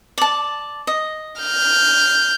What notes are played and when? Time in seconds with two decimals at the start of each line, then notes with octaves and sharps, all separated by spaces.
0.18 D5 A5
0.87 D#5
1.41 F6 G6